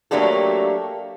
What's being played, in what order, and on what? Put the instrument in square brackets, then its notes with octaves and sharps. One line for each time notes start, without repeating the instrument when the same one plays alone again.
[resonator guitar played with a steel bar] F#3 A3 A#3 D4 G4 A4